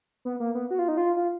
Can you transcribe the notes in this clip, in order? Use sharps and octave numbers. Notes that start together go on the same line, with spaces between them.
B3
A#3
B3
F#4
F4
D#4
F4
F4